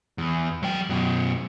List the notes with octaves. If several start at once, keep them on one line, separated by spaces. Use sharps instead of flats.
E2
F#3 G5
F#2 B2